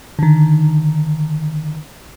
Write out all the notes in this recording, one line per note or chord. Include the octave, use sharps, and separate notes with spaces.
D3 D#3